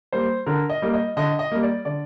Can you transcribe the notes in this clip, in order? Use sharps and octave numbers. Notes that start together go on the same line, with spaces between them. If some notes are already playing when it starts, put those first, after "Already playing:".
G3 A#3 C5
D3 A#4
D#5
G3 A#3
D#5
D3 D#5
D#5
G3 A#3
D5
D3 D5